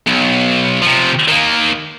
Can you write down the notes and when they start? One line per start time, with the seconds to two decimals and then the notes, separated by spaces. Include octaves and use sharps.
0.07 B1
0.82 C3 F3
1.28 D#3 A#3